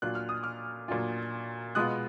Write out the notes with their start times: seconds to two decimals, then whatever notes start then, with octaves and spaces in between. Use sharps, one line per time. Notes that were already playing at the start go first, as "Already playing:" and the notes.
0.02 A#2 F#3 D4 F4 F#6
0.15 F6
0.29 D#6
0.43 D6 F6
0.88 A#2 F#3 D4 F4
1.75 B2 G#3 B3 F4 D#6 F#6